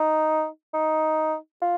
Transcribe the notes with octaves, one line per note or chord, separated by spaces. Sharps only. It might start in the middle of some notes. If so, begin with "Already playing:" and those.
Already playing: D#4
D#4
F4